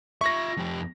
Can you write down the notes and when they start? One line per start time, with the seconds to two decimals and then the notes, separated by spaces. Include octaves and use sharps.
0.21 F4 E5 C#6 A#6
0.57 F2 G4